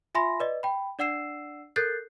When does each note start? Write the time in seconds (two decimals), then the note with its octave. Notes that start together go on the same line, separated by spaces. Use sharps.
0.15 F4 E5 G#5 B5 C6 A#6
0.40 B4 D5 D#5
0.63 G5 B5
0.99 D4 D5 F#5 E6 C7 E7
1.76 A4 A#4 F#6 G6 A6 C7